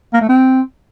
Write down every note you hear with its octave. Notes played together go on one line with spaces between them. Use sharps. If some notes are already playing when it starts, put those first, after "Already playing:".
A#3
A3
C4